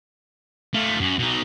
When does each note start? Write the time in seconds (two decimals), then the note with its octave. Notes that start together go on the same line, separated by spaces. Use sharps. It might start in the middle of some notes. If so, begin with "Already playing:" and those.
0.74 A3 F4
1.00 F#2
1.19 B2 D#4